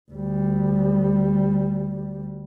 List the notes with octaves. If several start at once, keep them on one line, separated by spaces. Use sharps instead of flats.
D2 G3